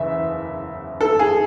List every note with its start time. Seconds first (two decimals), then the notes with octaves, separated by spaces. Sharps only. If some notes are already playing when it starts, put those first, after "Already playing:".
Already playing: F#1 E2 C#3 E5
1.01 A4
1.19 G#4